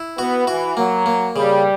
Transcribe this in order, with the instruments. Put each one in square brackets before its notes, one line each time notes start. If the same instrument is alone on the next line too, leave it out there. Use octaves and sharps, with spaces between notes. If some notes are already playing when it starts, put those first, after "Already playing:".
Already playing: [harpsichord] E4
[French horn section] B3 [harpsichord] F#4
[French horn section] E3 [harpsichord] F#4
[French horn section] F#3 [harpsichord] A#3
[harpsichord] A#3
[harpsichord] C#3 [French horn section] G3